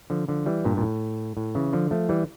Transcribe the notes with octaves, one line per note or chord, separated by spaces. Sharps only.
D3 F3
D3 F3
E3 G3
G2 A#2
A#2
A2
A2
C#3 E3
D3 F3
F3 A3
E3 G3